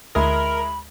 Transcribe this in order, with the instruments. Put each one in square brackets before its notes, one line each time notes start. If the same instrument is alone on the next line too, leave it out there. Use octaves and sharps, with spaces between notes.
[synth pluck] D2 D#6 [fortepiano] G#3 E4 [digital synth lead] A#4 [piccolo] B5